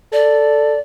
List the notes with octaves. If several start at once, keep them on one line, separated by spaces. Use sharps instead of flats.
A4 D5